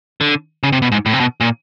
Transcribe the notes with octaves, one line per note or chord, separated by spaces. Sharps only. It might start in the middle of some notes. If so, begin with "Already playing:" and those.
D3
C#3
C3
B2
G#2
A2
C3
B2
A#2